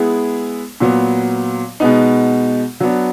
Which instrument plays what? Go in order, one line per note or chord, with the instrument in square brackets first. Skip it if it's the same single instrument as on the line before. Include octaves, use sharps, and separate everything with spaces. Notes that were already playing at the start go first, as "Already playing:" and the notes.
Already playing: [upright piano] G#3 B3 E4 G#4
A#2 F#3 B3
B2 G#3 B3 D#4
F#3 B3 D4